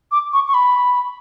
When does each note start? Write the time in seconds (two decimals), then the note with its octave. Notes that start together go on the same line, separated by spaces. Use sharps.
0.12 D6
0.33 C#6
0.48 C#6
0.54 B5